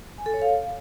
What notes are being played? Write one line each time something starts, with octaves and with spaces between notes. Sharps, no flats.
G#5
A4
C#5
F5